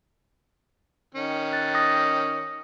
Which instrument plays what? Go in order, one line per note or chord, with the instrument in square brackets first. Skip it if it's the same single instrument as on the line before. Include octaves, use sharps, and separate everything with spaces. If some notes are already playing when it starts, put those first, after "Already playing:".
[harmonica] D#3 C#4
[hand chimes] F#6 A6
D#6 A#6